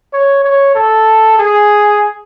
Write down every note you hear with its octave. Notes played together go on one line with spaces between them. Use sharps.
C#5
C#5
A4
G#4